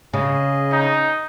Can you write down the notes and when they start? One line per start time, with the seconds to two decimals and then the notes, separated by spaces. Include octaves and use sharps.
0.14 C#3 G#4 D#5
0.72 D#4